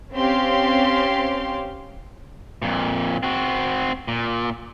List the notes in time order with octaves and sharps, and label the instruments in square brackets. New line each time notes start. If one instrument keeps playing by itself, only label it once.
[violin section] C4 C#4 G4 F5 C6
[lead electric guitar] F2 A#2
C4 F#4
A#2